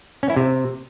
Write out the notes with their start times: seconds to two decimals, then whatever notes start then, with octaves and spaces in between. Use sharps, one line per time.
0.23 C#4
0.30 E4
0.36 C3